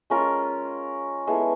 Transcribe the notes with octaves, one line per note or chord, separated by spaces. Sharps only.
G#3 C#4 F4 A#4
G#3 B3 E4 A4